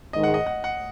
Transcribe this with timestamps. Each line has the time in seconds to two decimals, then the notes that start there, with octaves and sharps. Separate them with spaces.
0.13 G#2 D#3 G#3 D#5
0.23 F#5
0.34 D#5
0.46 F#5
0.64 F#5